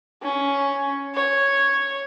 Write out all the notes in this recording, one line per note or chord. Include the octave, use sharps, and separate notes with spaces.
C#4
C#5